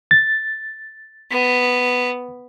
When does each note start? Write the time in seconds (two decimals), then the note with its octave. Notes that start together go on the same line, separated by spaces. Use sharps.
0.11 A6
1.32 B3